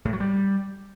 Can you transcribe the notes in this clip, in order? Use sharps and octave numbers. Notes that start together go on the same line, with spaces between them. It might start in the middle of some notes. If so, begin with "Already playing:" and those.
A2
F#3
G3